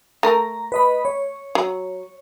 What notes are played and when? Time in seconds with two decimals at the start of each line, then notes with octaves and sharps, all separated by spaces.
0.23 A3 A#4 A#5
0.72 B4 D#5 B5
1.05 C#5
1.55 F#3